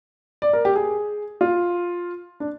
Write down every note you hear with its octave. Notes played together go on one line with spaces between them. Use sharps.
D5
A#4
G4
G#4
F4
D4